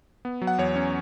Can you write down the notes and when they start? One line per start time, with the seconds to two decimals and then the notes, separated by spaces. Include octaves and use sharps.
0.25 B3
0.42 F#3
0.47 F#5
0.58 E2 C#5
0.76 C#4